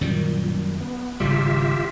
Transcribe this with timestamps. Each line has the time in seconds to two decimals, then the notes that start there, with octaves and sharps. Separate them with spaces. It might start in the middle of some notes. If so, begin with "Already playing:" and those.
0.01 F#2 A#2 D#3 G3
0.81 B3
1.20 G#1 C#3 G3 F4 G4 E5